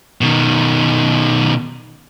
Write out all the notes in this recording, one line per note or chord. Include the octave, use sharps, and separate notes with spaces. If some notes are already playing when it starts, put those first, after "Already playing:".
B2 D#3